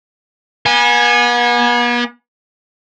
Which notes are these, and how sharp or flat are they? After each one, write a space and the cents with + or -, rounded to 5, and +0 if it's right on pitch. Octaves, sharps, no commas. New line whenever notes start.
B3 -40 G#5 -10